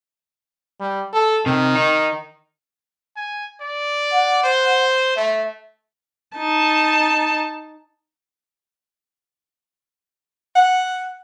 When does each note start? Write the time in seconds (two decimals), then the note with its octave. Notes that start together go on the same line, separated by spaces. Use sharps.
0.80 G3
1.13 A4
1.46 C3 D#3
1.76 D#4
3.16 G#5
3.61 D5
4.13 F#5
4.43 C5
5.17 A3 E5
6.37 D#4 A5
10.56 F#5